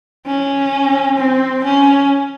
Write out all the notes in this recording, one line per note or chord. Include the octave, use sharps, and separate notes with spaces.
C#4
C4
C#4